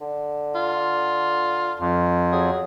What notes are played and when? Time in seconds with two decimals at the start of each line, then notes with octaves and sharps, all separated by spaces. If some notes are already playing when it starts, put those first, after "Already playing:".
0.01 D3
0.55 F4
1.79 F2
2.32 F#3 G#4